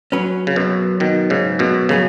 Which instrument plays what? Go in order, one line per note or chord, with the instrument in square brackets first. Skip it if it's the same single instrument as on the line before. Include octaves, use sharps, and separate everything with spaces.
[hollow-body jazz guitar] F#3 C#4 B4
[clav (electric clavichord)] C#3
F#2 B2
B2 D#3
G#2 C#3
F#2 B2
[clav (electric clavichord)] C#3 [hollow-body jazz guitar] F#3 B3 G#4